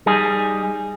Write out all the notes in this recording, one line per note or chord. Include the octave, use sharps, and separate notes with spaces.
G3 D#4 G#4